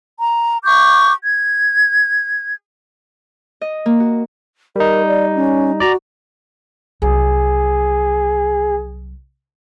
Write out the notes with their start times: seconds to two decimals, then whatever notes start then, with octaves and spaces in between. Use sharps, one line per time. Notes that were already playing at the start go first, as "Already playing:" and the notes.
0.19 A#5
0.65 C#6 D6 G6
1.24 G#6
3.61 D#5
3.86 A#3
4.00 F#4
4.76 G3 D#4 A#4
5.08 D5
5.35 C#4
5.80 F#4 D5 A#5
7.02 C2 F#3 G#4